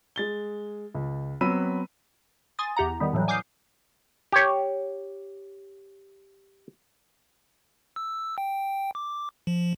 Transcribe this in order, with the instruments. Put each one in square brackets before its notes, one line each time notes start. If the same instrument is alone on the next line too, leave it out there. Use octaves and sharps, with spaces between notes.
[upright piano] G#3 A6 G7
C#2
F#3 B3 C4 B5 E6 D#7
[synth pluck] G#5 C6 D#6 A6
E2 G4 F#5 A#5
D#3 G3 B3
A2 E3 F#3 G3
G#5 D6 D#6 F6 G6 C7
[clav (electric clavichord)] G4 C#5
[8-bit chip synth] E6
G5
D6
F3